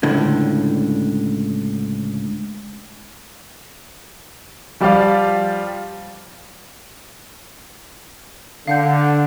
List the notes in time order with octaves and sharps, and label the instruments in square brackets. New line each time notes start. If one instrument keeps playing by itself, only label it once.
[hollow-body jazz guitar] C#2 A2 D3
[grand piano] F3 G3 F4 G4 D5 F5
[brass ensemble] D3 [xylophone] F5 F#5 G6